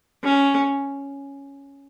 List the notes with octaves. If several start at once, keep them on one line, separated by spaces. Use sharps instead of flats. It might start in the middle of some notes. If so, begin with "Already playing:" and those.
C#4